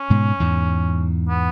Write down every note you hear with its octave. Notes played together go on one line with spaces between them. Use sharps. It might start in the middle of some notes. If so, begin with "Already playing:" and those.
Already playing: C#4
G#2 B2
E2 G#2
B3